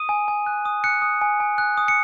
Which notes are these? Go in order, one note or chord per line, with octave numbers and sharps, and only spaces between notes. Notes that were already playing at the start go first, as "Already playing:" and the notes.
Already playing: D#6 D#7
G#5
G#5
F#6
D#6
F#6 C#7
D#6
G#5
G#5
F#6
D#6
C#7